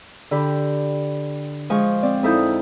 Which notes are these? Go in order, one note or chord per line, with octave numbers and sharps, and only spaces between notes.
D3 G4 B5
F3 G#3 G#5 C#6
C4 D5
F2 D#4 E4 A4 D#6 G6